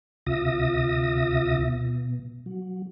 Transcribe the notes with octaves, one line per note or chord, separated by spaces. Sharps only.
D2 C3 F4 E5 D#6 A#6
B2
F#3